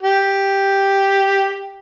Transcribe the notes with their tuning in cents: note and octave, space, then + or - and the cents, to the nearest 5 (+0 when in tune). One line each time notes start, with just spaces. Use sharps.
G4 +0